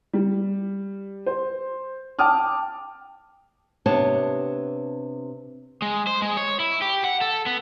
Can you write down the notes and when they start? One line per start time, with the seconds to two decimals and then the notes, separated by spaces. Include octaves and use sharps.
0.13 G3
1.26 C5
2.19 G5 A5 D6 D#6 F6
3.86 C3 B3 D4 G4 C#5 A5
5.82 G#3
6.07 C5
6.22 G#3
6.37 C#5
6.60 E4
6.82 G4
7.04 F#5
7.21 A4
7.46 B3